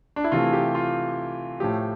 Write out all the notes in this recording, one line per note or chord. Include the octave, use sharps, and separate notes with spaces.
D4
E4
C3 E3 A3 F4
G4
F4
A2 F3 A3 G4